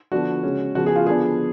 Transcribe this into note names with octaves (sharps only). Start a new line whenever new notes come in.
D3 F3 B3 D4 F#4
C#3 G#3 C#4
C#3 F3 B3 F#4
G#4
F4
D3 F3 B3 D4 G#4